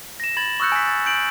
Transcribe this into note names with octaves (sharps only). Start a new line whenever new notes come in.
A#6 E7
B5 G#6 A6 F#7
C#6 D#6 E6 F#6 G6 C#7
G#5 B6
A6
G6 D7 F#7